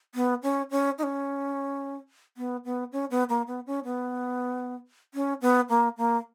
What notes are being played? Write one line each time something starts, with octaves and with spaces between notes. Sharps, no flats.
B3
C#4
C#4
D#4
C#4
B3
B3
C#4
B3
A#3
B3
C#4
B3
C#4
B3
A#3
A#3